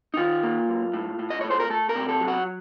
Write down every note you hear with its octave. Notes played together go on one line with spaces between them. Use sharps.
D#4
D#3 F4
A#3
F#2
A2
A2
D#5
A3 C#5
C5
A#4
A3 A4
A#4
C3
A4
F#3
F#4